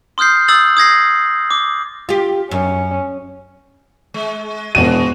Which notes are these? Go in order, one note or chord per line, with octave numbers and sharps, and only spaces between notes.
C6 D#6 F6 G6 C7
D#6 E6 A6 F#7
D#6 G#6 A#6 C7
D6
F4 G4
F#2 C#4
G#3
E1 E3 F#4 D#7